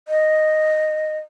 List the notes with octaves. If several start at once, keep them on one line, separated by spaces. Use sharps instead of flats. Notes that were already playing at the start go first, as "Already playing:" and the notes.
D#5